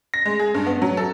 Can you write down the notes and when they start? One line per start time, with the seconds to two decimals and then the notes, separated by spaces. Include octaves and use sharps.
0.14 A#6
0.26 G#3
0.39 G#4
0.54 G2
0.66 B3
0.82 F#3
0.97 A4